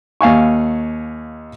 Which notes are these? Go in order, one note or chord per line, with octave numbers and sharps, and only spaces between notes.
D#2 F5 G#5 C#6